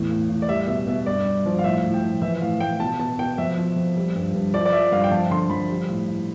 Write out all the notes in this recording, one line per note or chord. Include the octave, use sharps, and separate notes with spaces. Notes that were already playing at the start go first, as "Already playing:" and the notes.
Already playing: E2 A2
A2
A2
D5
G3 E5
B2 E5
B2 E5
G2 D5
G2
F3
F5
A2 E5
A2
G5
F3
E3 E5
A2 F5
A2 G5
B2 A5
B2 A5
B2 G5
F2 E5
F3
F2
G3
G2
G2
F3 D5
D5
F3 E5
G2 F5
G5
F2 A5
D3 C6
F2 B5
G3
A2
A2